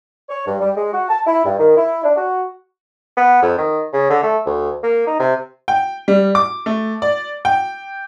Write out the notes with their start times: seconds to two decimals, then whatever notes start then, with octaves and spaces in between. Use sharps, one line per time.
0.29 C#5
0.47 G2
0.60 G3
0.76 G#3
0.93 F#4
1.09 A5
1.27 E4
1.45 G2
1.59 D#3
1.76 E4
2.04 D4
2.16 F#4
3.17 B3
3.42 F2
3.58 D#3
3.93 C#3
4.10 D3
4.23 A3
4.46 D2
4.84 A#3
5.07 D#4
5.20 C3
5.68 G5
6.08 G3
6.35 D6
6.66 A3
7.02 D5
7.45 G5